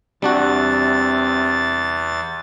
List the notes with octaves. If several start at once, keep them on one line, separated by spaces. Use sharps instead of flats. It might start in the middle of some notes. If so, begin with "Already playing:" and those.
E2 C3 G3 D4 F#4 A6